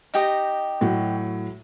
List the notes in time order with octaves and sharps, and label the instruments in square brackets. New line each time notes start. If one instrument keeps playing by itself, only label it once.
[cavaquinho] D#4 G4 D#5
[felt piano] A2 F#3 F#4